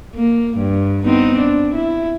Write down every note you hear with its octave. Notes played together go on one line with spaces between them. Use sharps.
A#3
G2
B3 C4 D#4
D4
E4